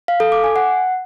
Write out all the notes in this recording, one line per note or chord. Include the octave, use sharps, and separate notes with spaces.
F5
A4
D6
G#5
F#5